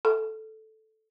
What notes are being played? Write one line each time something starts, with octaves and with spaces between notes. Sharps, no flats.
A4